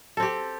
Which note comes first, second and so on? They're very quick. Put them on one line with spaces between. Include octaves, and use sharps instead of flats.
A4 C4 G4